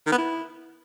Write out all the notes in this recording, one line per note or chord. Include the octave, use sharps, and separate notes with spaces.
D#3
B3
E4